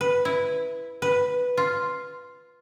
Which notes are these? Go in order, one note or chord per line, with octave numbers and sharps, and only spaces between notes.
B4
E4
B4
F4